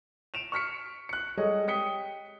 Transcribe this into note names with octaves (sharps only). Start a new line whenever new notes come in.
D7 E7 F7
C#6 F6 B6 C#7
F#6 C#7
G3 G#3 A4 C#5 D#5
G5 D#6 B6 C#7 G7